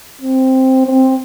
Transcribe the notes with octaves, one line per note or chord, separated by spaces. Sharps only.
C4
C4